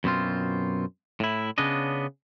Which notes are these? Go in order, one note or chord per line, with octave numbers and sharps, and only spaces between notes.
F#2 B2 C4 F4
A2 E4
C#3 B3 C#4 D4 D#5